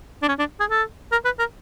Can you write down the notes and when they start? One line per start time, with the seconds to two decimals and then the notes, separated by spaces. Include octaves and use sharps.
0.23 D4
0.28 C#4
0.39 D4
0.60 G#4
0.70 A4
1.12 A#4
1.25 B4
1.39 A#4